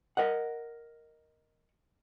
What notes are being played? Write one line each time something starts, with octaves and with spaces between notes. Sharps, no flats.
A#4 D#5 F#5